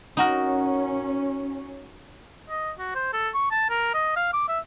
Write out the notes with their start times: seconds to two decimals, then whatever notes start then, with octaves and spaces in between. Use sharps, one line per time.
0.17 C#4 D#4 F#4 A#4
2.50 D#5
2.79 F#4
2.95 C5
3.13 A4
3.34 C#6
3.51 A5
3.70 A#4
3.94 D#5
4.17 F5
4.34 D6
4.49 E5